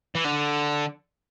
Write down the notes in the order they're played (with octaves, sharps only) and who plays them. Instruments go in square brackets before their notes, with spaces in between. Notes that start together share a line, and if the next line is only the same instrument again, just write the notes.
[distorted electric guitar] E3
D3